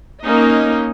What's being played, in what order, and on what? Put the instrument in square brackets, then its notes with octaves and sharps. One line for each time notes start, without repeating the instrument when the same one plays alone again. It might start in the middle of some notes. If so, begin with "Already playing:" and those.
[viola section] A#3 C#4 D#4 D#5